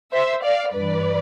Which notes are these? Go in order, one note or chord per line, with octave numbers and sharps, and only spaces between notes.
C5 E5
D5 F5
G2 E3 B4 D5